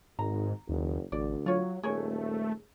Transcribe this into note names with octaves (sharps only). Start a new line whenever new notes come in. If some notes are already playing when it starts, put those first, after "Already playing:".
G#1 G#2 A#5
F#1 D#2
A1 D2 D5
F#3 F4 C#5
D#1 A3 G#4 A#4 C#5